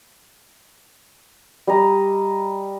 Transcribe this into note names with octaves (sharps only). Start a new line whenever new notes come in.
G3 D#5 A#5